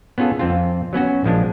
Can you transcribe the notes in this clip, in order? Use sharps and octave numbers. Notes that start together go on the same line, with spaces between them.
B3 C#4 F4 G#4 A4
F2 C4 F4
F#3 B3 C#4 F#4
A#1 F3 G#3 D4